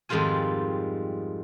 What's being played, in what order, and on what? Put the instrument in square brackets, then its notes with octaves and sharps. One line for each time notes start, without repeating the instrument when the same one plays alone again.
[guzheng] F2 G#2 D#3 G3 F4 G#5